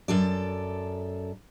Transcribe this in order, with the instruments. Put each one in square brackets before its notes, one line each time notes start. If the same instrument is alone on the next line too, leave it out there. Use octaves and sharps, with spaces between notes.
[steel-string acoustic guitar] F#2 A4 D5